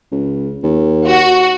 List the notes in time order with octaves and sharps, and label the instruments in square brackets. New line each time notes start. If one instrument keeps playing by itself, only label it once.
[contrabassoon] C#2
D#2
[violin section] F#4